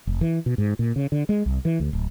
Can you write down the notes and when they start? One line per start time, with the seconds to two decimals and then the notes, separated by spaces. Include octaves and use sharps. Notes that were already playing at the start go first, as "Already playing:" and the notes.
0.07 F1
0.21 E3
0.46 B2
0.58 G#2
0.79 A#2
0.96 C#3
1.12 D3
1.29 G#3
1.46 C2
1.65 E3
1.80 D2
1.93 D1